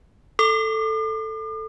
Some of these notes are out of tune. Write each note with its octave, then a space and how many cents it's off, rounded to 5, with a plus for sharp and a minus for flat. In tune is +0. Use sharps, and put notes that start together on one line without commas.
A4 +5 D6 +40